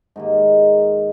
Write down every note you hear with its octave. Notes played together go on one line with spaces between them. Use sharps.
G#2 D#3 A#3